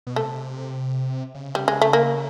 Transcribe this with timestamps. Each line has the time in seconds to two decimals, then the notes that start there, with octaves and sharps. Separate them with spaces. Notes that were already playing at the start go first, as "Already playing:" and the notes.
0.07 B2
0.16 C3 A3
1.35 C#3
1.55 G3
1.68 G#3
1.82 A3
1.93 A#3